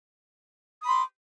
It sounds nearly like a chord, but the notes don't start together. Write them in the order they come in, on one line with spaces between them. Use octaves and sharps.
D#6 B5 C6 D6